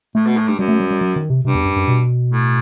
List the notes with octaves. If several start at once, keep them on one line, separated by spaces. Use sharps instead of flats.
A2 A3
B2
A2
G2
F#2 G3
A3
G3
G3
F#3
D#3
C3
G2 C3
E2
F#2
F#2
B2
A2